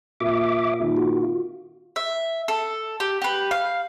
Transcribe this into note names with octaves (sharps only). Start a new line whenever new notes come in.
A#2 E5 D6
A#2 D#3
F#4
F4
E5
A4
G4
G4 B4
F5